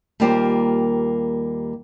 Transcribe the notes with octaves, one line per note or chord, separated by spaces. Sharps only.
D#2 G3 A#3 F4 G4 C5